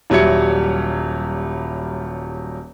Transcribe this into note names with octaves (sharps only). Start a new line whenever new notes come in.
D#1 F#3 G3 E5 G#6 C#7